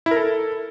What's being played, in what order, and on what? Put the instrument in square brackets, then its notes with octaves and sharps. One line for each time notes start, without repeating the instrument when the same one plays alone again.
[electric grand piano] E4
A#4
A4